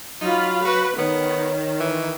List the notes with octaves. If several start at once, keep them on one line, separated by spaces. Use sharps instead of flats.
F#3 D#4 F4 F5 B5
F#4 B4
D#3 B3 C#5
E3